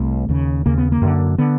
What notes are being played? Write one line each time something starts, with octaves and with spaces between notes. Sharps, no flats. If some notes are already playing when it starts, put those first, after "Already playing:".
Already playing: C2 C3 A3
D#2 C#3
D#2 C#3 A#3
B3
A#3
F#2 D3
D3 B3